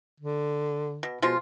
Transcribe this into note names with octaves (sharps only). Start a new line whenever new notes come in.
D3
B2
B2 F3 G#3 F4